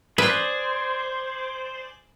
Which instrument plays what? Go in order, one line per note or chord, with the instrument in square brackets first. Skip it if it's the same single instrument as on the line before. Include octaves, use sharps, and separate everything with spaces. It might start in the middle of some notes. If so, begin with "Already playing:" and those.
[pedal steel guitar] G#4 D5 [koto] B4 [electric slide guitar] C5